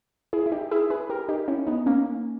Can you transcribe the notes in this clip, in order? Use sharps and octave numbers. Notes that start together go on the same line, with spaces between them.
E4 G#4
E4
D#4 G4
E4 G#4
G#4 B4
G4 A#4
D#4 G4
C#4 E4
B3 D#4
A#3 C#4